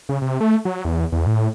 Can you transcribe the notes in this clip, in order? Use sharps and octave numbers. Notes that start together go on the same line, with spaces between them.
C#3
C3
A3
F#3
E2
E2
A2